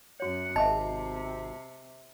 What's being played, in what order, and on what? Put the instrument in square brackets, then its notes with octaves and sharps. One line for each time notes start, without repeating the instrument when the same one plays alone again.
[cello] F#2 F#5 [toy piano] F#4 C#5
[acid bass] G#1 [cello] C3 [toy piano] D#5 E5 [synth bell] A5